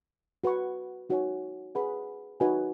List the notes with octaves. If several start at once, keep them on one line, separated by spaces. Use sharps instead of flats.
F#4 B4 F#5 C#6
D#4 F#4 C#5 G#5
G#4 B4 F#5 B5
D#4 F#4 B4 D#5 G#5